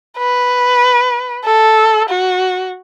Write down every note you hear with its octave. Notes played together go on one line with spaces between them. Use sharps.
B4
A4
F#4